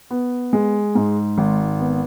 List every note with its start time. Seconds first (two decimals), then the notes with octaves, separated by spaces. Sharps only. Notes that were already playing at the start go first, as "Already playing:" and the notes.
0.10 B3
0.53 G#3
0.95 G#2
1.38 G#1
1.80 B3